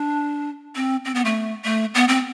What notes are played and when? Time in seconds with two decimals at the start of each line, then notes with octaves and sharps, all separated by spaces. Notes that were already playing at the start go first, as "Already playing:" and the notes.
Already playing: D4
0.75 C4
1.05 C4
1.15 B3
1.25 A3
1.65 A3
1.95 B3
2.08 C4